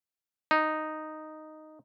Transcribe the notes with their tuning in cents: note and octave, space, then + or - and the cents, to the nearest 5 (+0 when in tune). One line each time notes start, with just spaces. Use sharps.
D#4 -5